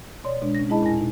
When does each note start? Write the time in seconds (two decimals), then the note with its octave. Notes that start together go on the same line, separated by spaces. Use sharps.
0.24 B2 C#5 D5 C6
0.42 B2 G#3 D4
0.55 C#4 A#6
0.69 G#3 E4 G#4 D#5 A5 B5
0.82 E2 A#2 E4 G#5 A#6
0.98 B2 D#4